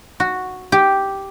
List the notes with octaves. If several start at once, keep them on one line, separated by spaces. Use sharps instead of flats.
F#4
G4